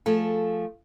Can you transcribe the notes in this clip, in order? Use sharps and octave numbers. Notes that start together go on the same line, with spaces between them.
F3 A3 G#4 A4